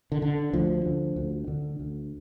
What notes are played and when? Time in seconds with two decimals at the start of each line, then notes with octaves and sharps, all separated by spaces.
0.12 D3
0.22 D3
0.53 D2 F3
0.85 D3
1.16 D2
1.48 D3
1.80 D2